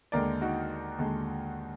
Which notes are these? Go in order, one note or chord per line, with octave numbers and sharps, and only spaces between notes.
D#2 D3 G#3 A#4 D5
D#4 F#4
D#2 D3 G#3